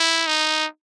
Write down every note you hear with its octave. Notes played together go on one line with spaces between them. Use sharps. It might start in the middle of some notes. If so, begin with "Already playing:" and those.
Already playing: E4
D#4